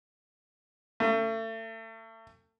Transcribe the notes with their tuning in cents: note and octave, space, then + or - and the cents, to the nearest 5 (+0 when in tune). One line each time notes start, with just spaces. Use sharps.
A3 +35